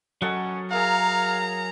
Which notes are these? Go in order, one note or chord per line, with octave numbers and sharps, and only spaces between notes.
F#3 C#4 A4 D#5 F#5
G#4 A#4 E5 F5 A#5